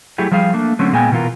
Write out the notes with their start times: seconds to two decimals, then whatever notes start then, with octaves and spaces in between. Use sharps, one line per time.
0.18 F#3 A3 E4 G4 G#4
0.31 F3 G3 G#4 F5
0.53 A3 A#3 D4
0.79 D3 F#3 A3 C4 C#4
0.93 A#2 G#3 B3 G5 G#5
1.12 B2 E3 B3 F4 A#4